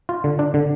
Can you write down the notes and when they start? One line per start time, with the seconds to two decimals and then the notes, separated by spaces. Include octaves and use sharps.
0.09 F4
0.24 D3
0.39 D4
0.54 D3